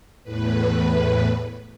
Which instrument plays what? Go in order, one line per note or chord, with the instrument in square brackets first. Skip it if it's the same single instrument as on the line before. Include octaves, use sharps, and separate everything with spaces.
[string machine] E2 A2 B4